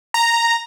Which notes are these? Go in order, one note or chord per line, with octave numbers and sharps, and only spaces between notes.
A#5